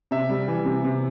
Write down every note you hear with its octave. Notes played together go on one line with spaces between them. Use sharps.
C3 E5
G3
E3
C3
C3